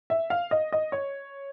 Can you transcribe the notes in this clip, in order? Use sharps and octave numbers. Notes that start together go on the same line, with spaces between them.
E5
F5
D#5
D#5
C#5